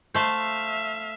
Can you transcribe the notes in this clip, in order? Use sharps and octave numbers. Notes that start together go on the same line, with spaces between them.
A3 C5 E5 F5